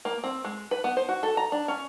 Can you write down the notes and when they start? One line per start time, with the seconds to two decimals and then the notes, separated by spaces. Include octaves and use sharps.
0.05 A#3
0.24 C4
0.44 G#3
0.71 B4
0.84 B3
0.97 C5
1.09 F#4
1.23 A4
1.37 A#5
1.52 D4
1.68 C#4